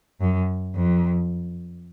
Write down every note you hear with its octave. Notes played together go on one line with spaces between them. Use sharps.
F#2
F2